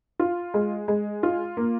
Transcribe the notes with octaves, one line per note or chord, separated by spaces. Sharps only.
F4
G#3
G#3
F4
A#3